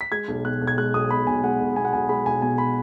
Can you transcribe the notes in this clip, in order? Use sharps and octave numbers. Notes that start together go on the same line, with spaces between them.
B6
G#3 G#6
B1
B2 F#6
B1
G#6
G#3 F#6
B1 D#6
B2 B5
B1 G#5
G#3 F#5
B1
B2 G#5
F#5
B1 G#5
G#3 B5
B1 G#5
B2 G#5
B5